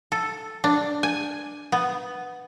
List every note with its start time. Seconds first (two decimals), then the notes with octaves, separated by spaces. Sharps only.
0.12 A4
0.64 D4
1.03 G#5
1.72 B3